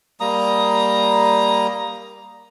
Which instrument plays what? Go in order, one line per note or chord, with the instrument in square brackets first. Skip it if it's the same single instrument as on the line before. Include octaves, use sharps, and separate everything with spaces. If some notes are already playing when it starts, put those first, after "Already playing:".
[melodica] G3 A#3 A#5 D#6